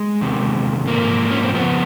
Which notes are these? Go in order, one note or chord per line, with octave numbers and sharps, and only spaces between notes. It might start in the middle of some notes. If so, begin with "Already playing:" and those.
Already playing: G#3
E2 C3 D#3
G#2 F3 A#3
C#4
C4
F2 C#3 F3 B3